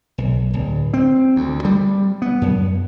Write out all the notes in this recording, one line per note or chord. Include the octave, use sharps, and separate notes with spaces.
B1
D1
C4
D2
G3
B3
F#2